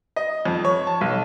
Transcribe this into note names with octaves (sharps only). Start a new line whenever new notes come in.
D#5
F2
C#5
A5
B1